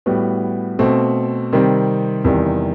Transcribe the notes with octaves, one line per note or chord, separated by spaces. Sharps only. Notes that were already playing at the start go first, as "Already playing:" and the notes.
A2 G3 B3 F#4
B2 A3 C4
C3 D#3 G3 C4
E2 C3 D#3 G3